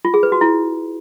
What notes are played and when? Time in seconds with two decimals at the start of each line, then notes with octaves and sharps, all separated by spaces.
0.05 F4
0.14 G#4
0.23 B4
0.32 F#4
0.41 E4